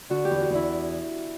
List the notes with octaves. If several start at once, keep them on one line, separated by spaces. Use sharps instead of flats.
D3 F#4
G4
E2
F#4
E2
E4